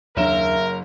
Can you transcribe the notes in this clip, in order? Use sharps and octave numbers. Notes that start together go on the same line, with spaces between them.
F#1 D#2 D4 A#4 C#5 E5 E7